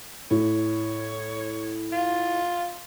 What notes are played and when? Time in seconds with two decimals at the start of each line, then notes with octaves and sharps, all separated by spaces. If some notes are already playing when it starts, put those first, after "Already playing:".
0.31 A2 C#5
1.92 F4